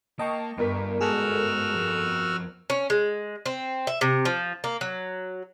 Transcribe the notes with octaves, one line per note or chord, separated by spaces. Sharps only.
A#3 D#5 G5 A5 C#6
G1 G2 A#4 B6
G#2 F#4 G#4 A4 E6 F6
F2
C#4
G#3
C4
E5
C3
F3
A#3
F#3